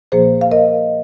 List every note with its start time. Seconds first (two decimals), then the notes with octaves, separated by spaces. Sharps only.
0.12 A#2 F3 A#3 G#4 C5
0.41 F5
0.52 A#4 D#5